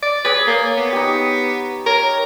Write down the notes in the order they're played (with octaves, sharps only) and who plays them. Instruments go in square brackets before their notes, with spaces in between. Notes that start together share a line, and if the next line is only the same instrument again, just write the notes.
[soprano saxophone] D5
[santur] G#4 C#5 D5 [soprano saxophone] B4
[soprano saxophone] A#3
B3
[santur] D#4 G4
[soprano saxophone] A#4 [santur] C#5